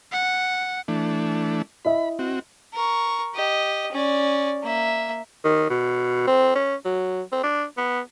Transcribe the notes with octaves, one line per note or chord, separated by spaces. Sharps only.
F#5
E3 A3 D4
E4 D#5 E5 B5
C4 F#4
A#4 C#6
G4 D#5
C#4 D5
A#3 E5
D#3
B2
C4
C#4
F#3
C4
D4
B3